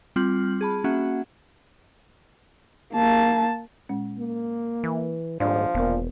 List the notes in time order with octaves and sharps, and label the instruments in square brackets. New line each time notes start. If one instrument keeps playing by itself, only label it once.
[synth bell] G3 C4 F4 F6 F#7
G#4 A5 B5
A#3 C#4 F#4 E5 F#5
[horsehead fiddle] A#3 A5
[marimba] A#2 G#3 C#4
[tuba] A#3
[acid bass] E3
[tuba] D#1 [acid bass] G#2 [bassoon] F3 [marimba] D4 D5
[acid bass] E1 [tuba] A#2 [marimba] B3 A#4